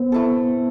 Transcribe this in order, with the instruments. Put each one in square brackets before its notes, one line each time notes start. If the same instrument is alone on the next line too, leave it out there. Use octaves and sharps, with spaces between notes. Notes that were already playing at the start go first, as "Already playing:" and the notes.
Already playing: [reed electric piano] B3 [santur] C4
[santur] A3 E4 A4